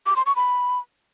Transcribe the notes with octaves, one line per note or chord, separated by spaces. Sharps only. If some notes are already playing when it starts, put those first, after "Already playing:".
D6
C6
C#6
B5